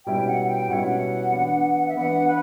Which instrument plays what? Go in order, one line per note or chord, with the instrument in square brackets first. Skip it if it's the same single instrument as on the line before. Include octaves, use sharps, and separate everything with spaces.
[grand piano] B2 G3 C#4 E4 [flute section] G5
[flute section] F#5
G5
[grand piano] B2 G3 C#4 E4 [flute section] F#5
[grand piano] E3 B3 D4
[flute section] E5
[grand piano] E3 B3 D4 [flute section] F#5
[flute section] B4